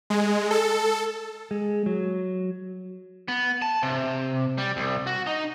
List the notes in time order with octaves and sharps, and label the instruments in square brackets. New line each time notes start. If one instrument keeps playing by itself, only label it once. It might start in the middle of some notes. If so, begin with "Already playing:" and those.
[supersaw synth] G#3
A4
[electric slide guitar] G#3
F#3
[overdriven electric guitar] B3
A5
C3
G3
C2
F#4
D#4